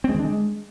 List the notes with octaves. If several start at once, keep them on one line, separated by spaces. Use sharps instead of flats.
C4
G#3
D#3
D4
G#3